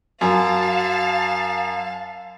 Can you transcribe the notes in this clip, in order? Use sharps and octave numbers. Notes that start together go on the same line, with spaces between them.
F#2 F5 A5